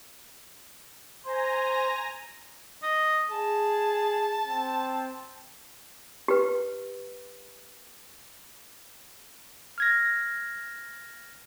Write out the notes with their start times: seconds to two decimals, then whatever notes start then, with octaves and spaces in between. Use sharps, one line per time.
1.25 C5 G#5 A#5 A#6
2.83 D#5
3.31 G#4 A5
4.47 C4
6.28 G4 B4
9.78 F6 G#6 A#6